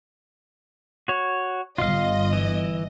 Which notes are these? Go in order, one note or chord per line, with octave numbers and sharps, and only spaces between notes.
F#4 C#5
G1 F4 D#5 F5
E3